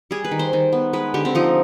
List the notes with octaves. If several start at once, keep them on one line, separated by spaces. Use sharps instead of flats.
G3 G#4
B4
D#3
C5
D#3
B3
G#3 B4
D3 G4
C4
F3 D#4